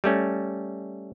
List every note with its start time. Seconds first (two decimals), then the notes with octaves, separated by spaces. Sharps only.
0.04 G3 A3 C#4